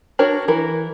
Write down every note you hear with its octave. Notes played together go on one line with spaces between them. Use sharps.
D4 F#4 A#4 C#5
E3 A#4